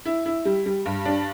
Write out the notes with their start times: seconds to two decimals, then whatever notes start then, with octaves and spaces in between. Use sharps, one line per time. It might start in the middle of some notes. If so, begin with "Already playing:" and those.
0.05 E4
0.26 E4
0.45 G3
0.66 G3
0.86 G2
1.05 D4